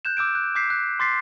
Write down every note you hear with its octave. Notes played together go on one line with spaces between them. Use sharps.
F#6 G6 E7
D6 E6 G6 D7
F#6
D6 G6 B6 C7
F#6
C6 D6 A6 B6 C7